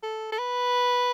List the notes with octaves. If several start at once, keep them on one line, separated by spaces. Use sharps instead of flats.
A4
A4
B4